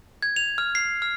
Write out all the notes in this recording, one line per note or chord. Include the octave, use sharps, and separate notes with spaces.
G#6
F7
F6
C7
F6